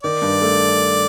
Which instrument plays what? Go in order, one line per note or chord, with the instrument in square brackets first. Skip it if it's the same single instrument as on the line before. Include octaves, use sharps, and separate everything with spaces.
[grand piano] D#3 [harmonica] D5
[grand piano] G2
A3